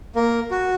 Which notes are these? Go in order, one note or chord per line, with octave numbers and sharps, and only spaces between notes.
A#3 A#4
F#4